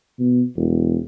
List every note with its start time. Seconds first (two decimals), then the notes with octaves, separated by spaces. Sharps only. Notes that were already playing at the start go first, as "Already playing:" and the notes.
0.19 B2
0.56 E1